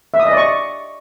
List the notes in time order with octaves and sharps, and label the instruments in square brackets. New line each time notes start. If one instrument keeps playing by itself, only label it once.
[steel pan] E5
D#6
D#5
D5
C#6